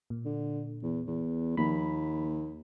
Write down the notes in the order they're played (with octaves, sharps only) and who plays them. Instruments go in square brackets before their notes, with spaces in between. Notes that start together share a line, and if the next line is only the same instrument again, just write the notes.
[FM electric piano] A#2
[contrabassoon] D3
E2
E2
[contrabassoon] D#2 [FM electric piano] F3 A#3 B5